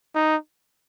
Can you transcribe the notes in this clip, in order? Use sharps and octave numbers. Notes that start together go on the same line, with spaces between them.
D#4